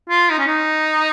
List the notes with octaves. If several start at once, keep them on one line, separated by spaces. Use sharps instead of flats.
F4
D#4
C#4
D#4